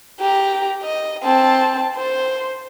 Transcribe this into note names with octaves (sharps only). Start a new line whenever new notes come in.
G4 A#5
D#5
C4 A5
C5